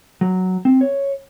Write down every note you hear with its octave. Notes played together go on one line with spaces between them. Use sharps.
F#3
C4
C#5